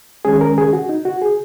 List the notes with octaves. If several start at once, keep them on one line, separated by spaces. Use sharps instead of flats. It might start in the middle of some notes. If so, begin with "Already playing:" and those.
D#3 G#3 C#4 G#4
A#4
G#4
F#4
D#4
F#4
G#4